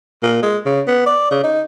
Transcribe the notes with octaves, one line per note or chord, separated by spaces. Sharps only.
A#2
G#3
C#3
B3
D5
C#3
D#4